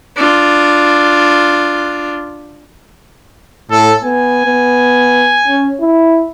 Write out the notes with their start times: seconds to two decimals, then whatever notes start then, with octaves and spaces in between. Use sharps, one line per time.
0.16 D4 F4
3.71 A2 A4
4.04 B3 G#5
4.46 B3
5.48 C#4
5.81 E4